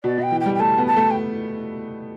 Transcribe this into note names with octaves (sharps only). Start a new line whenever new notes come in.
B2 D5
B2 G5
E3
G5
G3
G5
A3 A5
B3
A5
A3
G5